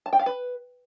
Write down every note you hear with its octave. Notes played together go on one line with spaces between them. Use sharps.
A5
G5
F5
B4